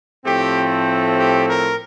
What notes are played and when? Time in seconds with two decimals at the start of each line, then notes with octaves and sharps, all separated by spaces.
0.24 A2 F3 A3 C4 G4
1.17 G4
1.47 A#4